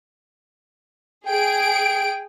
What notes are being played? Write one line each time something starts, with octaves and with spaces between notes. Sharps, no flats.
G#4 G5 D7